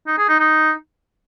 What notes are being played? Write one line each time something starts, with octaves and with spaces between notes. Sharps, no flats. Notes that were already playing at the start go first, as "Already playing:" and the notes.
D#4
G#4
D#4
D#4